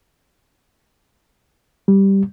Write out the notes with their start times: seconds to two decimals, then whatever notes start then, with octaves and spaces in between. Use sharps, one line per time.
1.88 G3